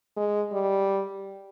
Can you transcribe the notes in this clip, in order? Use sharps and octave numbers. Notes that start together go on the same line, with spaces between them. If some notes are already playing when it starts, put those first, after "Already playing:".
G#3
G3